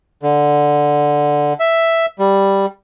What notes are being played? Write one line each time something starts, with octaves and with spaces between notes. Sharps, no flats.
D3
E5
G3